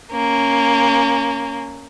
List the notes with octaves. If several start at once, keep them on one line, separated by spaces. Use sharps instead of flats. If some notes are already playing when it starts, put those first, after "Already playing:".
A#3 C#4